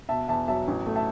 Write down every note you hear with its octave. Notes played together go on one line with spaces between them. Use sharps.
B2 E5 A5
E2 E5 A5
F#3 E5 A5
A1
A3
E5 A5